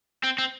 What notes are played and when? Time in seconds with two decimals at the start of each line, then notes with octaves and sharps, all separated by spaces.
0.24 C4
0.39 C4